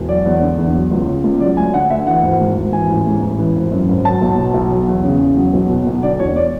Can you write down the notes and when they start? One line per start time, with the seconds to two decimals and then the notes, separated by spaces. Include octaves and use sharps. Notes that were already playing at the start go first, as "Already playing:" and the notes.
Already playing: E1
0.09 F#3 D5
0.25 E2
0.42 D3
0.58 E2
0.75 F#3
0.91 C#2
1.08 C#3
1.24 C#2
1.40 F#3 D5
1.57 D2 G#5
1.74 D3 F#5
1.90 D2 E5
2.07 E3 F#5
2.23 G#1
2.40 G#2
2.56 G#1
2.73 E3 G#5
2.89 A1
3.06 G#2
3.22 A1
3.39 E3
3.56 G#1
3.72 F#2
3.89 G#1
4.05 F#3 A5
4.21 B1
4.38 B2
4.54 B1
4.71 F#3
4.87 E2
5.04 C#3
5.20 E2
5.37 F#3
5.53 B1
5.69 B2
5.87 B1
6.03 D3 D5
6.19 E1 C#5
6.36 D5